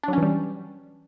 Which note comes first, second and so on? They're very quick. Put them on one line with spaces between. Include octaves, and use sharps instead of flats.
D4 F#3 C#4 E3 G3